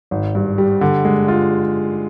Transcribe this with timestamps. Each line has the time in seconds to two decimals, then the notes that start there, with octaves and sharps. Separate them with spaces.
0.11 G#1
0.35 G2
0.58 G3
0.81 D3
1.05 G#3
1.28 F4